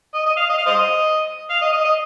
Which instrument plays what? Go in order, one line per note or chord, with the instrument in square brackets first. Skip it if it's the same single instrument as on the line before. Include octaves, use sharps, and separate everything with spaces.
[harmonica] D#5
D#5
F5
D#5
F5
C5 D#5
F5
D#5
D#5
D#5